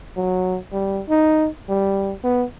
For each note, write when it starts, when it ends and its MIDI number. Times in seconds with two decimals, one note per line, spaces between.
0.16 0.58 54
0.72 1.01 55
1.09 1.49 63
1.69 2.14 55
2.24 2.45 59